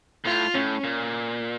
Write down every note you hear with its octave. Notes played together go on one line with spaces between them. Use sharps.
A2 F4
A2 C#4
A#2